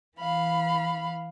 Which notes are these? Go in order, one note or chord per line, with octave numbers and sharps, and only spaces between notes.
E3 F5 B5